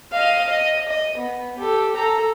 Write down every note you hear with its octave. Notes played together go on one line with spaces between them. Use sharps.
D#5 F5
D#5
D#5
B3
G4 A4
A4 A#5